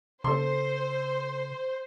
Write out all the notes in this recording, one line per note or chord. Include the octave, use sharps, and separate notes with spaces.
C#3 A4 C5 C6